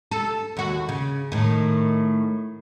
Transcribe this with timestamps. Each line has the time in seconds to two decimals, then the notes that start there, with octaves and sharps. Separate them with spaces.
0.11 A4
0.57 D#2 F#4
0.89 C#3
1.32 A2 D#3